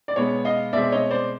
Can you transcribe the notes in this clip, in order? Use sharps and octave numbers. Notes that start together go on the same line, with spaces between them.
D5
B2 G#3 B3 C#5
D#5 F5
B2 G#3 C4 D5 E5
C#5 D#5
C5 D5